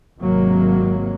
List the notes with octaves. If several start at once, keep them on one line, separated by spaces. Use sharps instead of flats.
G#1 C3 F#3 A#3